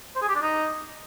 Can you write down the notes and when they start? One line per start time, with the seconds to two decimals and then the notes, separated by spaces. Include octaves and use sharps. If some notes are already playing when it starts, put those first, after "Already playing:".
0.15 C5
0.22 G#4
0.28 G4
0.35 D4
0.42 D#4